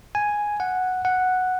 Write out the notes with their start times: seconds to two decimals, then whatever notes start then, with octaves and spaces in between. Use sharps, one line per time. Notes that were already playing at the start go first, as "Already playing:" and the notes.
0.15 G#5
0.60 F#5
1.05 F#5